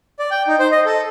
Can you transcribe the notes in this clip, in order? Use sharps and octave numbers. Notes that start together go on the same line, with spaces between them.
D5
G5
D#4
C5
D#5
A4